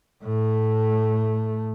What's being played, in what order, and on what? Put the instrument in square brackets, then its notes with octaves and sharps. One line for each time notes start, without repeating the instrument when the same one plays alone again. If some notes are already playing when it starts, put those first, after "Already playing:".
[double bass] A2 A3